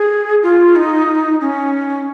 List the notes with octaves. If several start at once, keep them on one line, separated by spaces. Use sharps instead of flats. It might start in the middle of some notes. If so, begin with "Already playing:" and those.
Already playing: G#4
F4
D#4
C#4